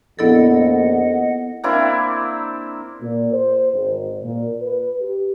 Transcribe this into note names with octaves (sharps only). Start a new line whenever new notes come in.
A#1 F2 B3 E4 A4 D#5 F#5
A#3 C4 D4 E4
A#2
C5
G#1
A#2
B4
G4